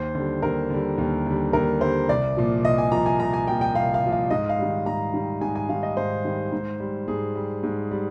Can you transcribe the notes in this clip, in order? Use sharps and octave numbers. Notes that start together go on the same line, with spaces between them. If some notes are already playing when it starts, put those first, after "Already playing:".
Already playing: D#2 C5
D3 G3
D#2 A#4
D3 G3
D#2
D3 G3
D#2 A#4
D3 G3 C5
C2 D5
A#2 F3
C2 D#5
G#5
A#2 F3 A#5
G#5
C2 A#5
G#5
A#2 F3 G5
G5
C2 F5
F5
A#2 F3
F5
G#2 D#5
F5
D#3 G3
G#2 A#5
D#3 G3
G#2 G#5
G#5
D#3 G3 F5
D#5
G#2 C5
D#3 G3
G#2
G3
G#2 G#4
G3
G#2
G3